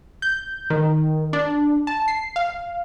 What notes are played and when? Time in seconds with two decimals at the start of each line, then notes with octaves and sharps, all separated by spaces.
0.22 G6
0.70 D#3
1.33 D4
1.87 A5
2.08 C7
2.36 F5